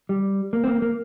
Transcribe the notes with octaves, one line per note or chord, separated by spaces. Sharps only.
G3
A#3
C4
A#3
A#3